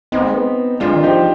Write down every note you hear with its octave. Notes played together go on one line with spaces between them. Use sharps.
B3 C4 D#4
G#3
B3
G#3 D4 F4
D#3
F3 D#4 G4